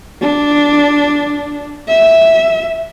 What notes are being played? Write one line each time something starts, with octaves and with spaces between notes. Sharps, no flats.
D4
E5